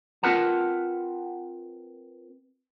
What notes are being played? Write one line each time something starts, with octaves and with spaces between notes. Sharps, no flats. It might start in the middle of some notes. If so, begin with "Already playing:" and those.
C4 F4 A#4 B4 F#5 A5